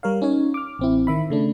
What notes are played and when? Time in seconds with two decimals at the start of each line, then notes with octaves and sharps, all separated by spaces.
0.03 G3 A#4 C#5 F5
0.22 C#4 D#4 C#5
0.54 D6 F6
0.79 A1 C4 E4
1.07 D#3 E5 B5
1.30 C#3 A3 D4